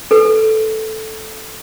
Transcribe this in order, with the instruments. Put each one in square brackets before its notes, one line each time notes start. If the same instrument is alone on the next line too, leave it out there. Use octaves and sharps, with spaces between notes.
[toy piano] A4 B4